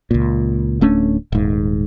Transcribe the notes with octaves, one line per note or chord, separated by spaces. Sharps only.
C#2 A#2
D1 A3 C#4 D4
D#1 G#2